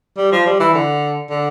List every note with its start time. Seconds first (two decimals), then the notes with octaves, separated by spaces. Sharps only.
0.17 G3
0.32 F3
0.46 G3
0.60 E3
0.74 D3
1.30 D3